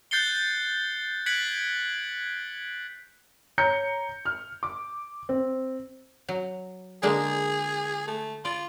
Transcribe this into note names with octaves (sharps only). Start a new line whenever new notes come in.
F#6 G6 A6 C7 C#7 G7
F#6 G#6 B6 C#7 D7 F#7
C#5 A#5 G6 C#7
F6
D6
C4
F#3
D3 G#3 A#3 G#4
A3
F4 D5